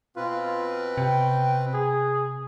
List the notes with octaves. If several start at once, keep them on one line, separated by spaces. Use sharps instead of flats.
B2 C4 F4 B4
C3 G5
G#4